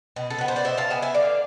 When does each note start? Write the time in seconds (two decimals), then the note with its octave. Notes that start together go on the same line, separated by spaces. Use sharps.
0.16 B2
0.30 A4
0.38 B3 B4
0.48 C5
0.56 D5
0.65 B2 C5 E5
0.77 F5 A5
0.90 B3 E5 G#5
1.02 E5 G#5
1.14 D3 D5 F5